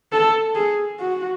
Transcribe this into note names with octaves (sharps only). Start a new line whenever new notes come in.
A4
G#4
F#4